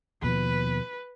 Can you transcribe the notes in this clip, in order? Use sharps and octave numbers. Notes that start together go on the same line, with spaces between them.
D#2 B2 F3 B4